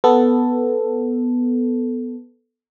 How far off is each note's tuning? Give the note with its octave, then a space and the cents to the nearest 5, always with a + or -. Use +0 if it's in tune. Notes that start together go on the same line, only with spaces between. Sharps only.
B3 +0 A4 +0